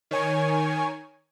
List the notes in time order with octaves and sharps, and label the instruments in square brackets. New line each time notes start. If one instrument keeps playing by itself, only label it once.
[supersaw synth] D#3 C#5 G#5